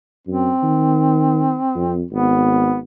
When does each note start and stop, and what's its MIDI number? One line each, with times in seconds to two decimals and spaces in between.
0.27 0.51 42
0.27 2.05 60
0.63 1.56 51
1.76 2.03 41
2.11 2.82 32
2.11 2.79 59